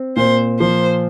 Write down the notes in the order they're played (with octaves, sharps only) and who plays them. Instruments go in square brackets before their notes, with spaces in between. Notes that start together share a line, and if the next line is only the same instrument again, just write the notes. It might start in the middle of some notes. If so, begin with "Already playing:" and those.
Already playing: [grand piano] C4
[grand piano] A#2 [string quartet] C5
[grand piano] F3 [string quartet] C5